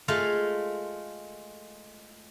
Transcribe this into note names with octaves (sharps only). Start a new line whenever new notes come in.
G#3 A3 F4 F5